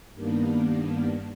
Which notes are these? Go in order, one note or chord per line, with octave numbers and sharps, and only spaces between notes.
G2 D#3 A#3 B3 D4